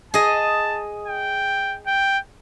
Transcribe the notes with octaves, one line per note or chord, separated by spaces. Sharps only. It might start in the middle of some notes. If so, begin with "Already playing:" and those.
G#4 D#5 A5
G5
G5